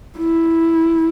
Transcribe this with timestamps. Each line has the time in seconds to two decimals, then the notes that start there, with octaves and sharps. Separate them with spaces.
0.17 E4